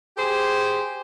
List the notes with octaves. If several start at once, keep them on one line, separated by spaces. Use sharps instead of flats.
G4 G#4 C5